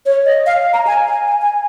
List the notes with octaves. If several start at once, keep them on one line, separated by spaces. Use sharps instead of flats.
C#5
D#5
F5
A#5
G#5
G#5
G#5
G#5